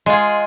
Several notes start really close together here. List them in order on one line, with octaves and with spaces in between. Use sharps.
G#3 F4 G#4